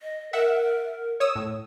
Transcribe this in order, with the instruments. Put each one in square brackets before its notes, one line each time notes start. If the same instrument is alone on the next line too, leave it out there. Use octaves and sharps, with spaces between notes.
[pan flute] D#5
[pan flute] A#4 [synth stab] E5 F#5
[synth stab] C#5 D#6 E6
A2